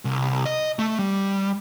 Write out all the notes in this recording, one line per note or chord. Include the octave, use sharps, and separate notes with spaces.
C2
D#5
A3
G3